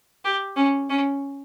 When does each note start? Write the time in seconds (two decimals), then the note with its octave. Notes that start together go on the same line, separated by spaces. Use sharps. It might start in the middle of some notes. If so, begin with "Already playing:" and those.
0.25 G4
0.57 C#4
0.90 C#4